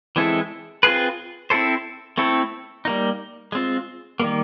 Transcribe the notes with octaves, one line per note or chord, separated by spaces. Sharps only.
E3 G#3 C4 E4 A4
C4 F4 G#4 B4
C4 E4 A4 C5
A3 C4 E4 A4
G3 A#3 D#4
G#3 C4 F4
D#3 G3 A#3